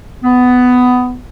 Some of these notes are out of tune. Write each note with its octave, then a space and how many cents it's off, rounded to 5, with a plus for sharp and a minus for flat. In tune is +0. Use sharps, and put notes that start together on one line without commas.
B3 +15